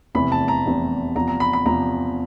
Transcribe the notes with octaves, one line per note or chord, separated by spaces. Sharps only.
F1 E2 C3 E3 B5
A5
A#5
F1 E2 C3 E3
E2 C3 F3 A#5
A#5
B5
B5
E2 C3 F3 A#5